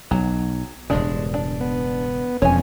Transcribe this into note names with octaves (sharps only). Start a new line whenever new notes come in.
B1 F#3
E1 G2 C#3 G#3 D4
D4
B3
E1 F2 C#4 C#5 G#5